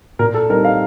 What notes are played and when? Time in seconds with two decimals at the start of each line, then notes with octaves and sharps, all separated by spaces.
0.19 A#2 A#4
0.34 A4
0.49 G3 C4 D#4 A#4
0.64 F5